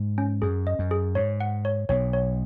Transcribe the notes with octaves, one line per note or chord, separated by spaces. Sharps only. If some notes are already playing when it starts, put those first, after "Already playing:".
Already playing: G#2
C#4
F#2 G#4
D#5
F#2
G#4
G#2 C#5
F#5
C#5
B1 B2 C#5
C#5